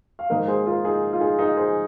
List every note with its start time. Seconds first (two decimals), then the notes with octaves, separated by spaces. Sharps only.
0.19 F5
0.30 G#2 D#3 A#3 A#4 D#5
0.48 G#4 C5
0.66 F4 A#4
0.85 D#4 G#4
1.13 F4
1.20 D#4 G#4
1.38 D#4 G#4
1.57 G#4 C5